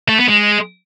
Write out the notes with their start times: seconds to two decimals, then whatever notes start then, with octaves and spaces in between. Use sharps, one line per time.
0.09 A3
0.18 B3
0.28 G#3